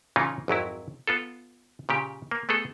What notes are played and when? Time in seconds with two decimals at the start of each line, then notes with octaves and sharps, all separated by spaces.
0.16 A#2 C#3 E3 C#4 D#4 F4
0.48 G#1 F2 F#3 E4
1.07 B3 F4 A4
1.89 A#2 C#3 G4
2.31 A#3
2.49 A3 B3 G#4 A4